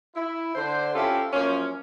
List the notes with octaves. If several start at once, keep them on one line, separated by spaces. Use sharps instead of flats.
E4
D3 C5
C4 C#4 E4 F4 G4 A4
F#2 F3 A#3 C#4